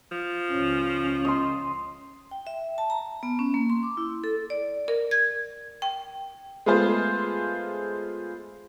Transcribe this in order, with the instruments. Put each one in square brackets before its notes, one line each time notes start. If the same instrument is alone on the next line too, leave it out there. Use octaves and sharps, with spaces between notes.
[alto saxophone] F3
[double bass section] C#2 C#4
[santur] D#5 C6
[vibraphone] G5
E5
A5
A#5
B3
C#4
A#3
C6
D6
E4
A4
[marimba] D5
A#4
G#6
G5
[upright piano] G#3 A3 B3 F4 G#4 C5